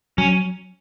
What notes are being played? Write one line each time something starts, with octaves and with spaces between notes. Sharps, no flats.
F#3 C#4